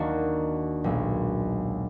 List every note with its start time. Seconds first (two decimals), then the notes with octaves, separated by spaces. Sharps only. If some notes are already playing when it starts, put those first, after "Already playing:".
Already playing: D#2 D#3 A#3 D4 F#4
0.84 B1 A#2 G#3